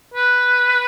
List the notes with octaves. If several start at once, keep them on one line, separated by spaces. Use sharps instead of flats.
B4